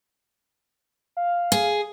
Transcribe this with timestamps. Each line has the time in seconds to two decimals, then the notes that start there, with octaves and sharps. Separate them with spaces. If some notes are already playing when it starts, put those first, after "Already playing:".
1.17 F5
1.52 G#4